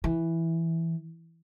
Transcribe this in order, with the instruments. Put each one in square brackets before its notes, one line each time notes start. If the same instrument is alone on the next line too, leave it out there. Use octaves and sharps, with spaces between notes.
[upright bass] E3